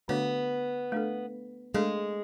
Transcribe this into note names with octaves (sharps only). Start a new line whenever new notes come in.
D3 A3 B3 D4 F#4 C#5
A3 D4 A4
G#3 A3 D4 A4